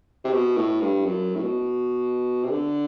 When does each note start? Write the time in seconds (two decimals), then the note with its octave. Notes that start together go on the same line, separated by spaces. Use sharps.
0.24 C3
0.33 B2
0.57 A2
0.81 G2
1.06 F#2
1.36 A2
1.43 B2
2.44 C3
2.51 D3